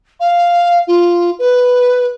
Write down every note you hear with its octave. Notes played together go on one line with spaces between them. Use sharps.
F5
F4
B4